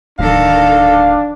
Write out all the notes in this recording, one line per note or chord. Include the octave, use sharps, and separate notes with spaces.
D1 D#3 D4 A4 F5